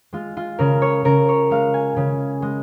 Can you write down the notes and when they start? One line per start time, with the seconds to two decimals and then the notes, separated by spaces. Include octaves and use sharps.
0.13 G#3 F4
0.37 F4
0.59 C#3 A#4
0.82 C#5
1.05 C#3 A#4
1.29 C#5
1.50 G#3 F5
1.74 G#5
1.97 C#3 G#5
2.42 G#3